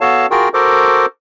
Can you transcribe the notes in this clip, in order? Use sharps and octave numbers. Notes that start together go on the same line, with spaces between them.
B3 F#4 A4 C#5 F5 A5
F4 F#4 G#4 A#4 G5
F#4 A4 A#4 C5 D6